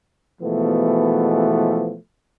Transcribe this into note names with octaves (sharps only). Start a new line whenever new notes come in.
B2 E3 F3 G#3 A3 B3